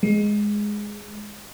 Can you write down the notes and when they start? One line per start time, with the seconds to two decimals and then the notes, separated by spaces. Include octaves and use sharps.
0.03 G#3